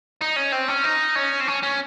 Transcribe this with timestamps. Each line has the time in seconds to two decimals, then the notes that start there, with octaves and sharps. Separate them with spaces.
0.21 D#4
0.36 C#4
0.52 C4
0.68 C#4
0.84 D#4
1.15 C#4
1.40 C4
1.47 C#4
1.63 C#4